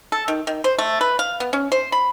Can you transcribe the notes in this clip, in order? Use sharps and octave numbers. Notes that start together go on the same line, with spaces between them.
A4
D#3
D#3
C5
A3
B4
F5
B3
C#4
C5
B5